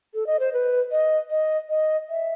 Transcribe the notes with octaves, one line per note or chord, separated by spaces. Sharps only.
A4
D#5
C5
B4
D#5
D#5
D#5
E5